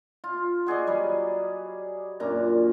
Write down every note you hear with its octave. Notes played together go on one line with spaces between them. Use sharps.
F4
F#4 G#4 D5 D#5
F#3 G3 G#4
F#2 A#2 D4 A#5